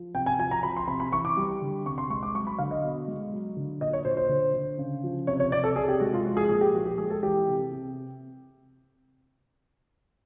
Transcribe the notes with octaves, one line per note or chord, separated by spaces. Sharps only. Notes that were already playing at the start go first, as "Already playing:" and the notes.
Already playing: F3
C3 G5
G#5
F3 G#5
A#5
F3 B5
C6
C3 B5
B5
E3 C#6
D6
G3
D3
C3 C#6
C6
G#3 C#6
D6
F#3 C#6
B5
D3 F5
D#5
B2
G#3
F#3
D3
A#2 D#5
C#5
A#2 C5
C5
D3
D3
C#3
F3
C3 C#5
C#5
C3 D5
A4
C3 G#4
G4
G#3 F#4
F4
F3 F#4
G#4
A#2 G#4
G4
F3 F#4
G4
G#3 G#4
A4
E3 G4
C3
C3